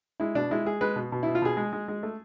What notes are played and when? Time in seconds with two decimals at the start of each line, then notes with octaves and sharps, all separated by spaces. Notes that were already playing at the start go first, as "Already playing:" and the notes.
0.20 G#3 E4
0.35 B2 D4
0.51 G#3 E4
0.65 G#3 G#4
0.81 G#3 B4
0.96 B2
1.12 B2
1.23 B2 E4
1.35 F4
1.42 B2 G#4
1.57 G#3
1.73 G#3
1.88 G#3
2.03 A3